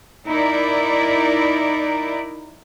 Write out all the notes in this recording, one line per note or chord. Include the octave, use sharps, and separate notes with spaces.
D#4 E4 A#4 D5